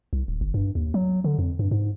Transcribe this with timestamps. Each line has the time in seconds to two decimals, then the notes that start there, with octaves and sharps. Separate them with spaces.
0.13 C2
0.28 D1
0.41 G1
0.54 G2
0.75 D#2
0.94 F#3
1.24 D3
1.39 F2
1.59 G2
1.71 G#2